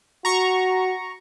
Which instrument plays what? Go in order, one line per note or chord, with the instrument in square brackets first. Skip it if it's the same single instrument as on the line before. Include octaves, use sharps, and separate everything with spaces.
[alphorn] F#4 [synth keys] A#5 C#6